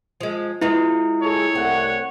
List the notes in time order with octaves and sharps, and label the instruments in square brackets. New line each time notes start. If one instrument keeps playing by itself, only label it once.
[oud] F3 G#3
[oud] G#3 F4 B4 [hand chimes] E4
[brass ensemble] G#4 A4 [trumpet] C#5
[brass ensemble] C2 A3 F#5 [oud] C4